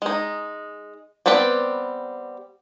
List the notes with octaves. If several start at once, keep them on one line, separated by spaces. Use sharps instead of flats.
G#3 D#4
G3 B3 C4 B4 D5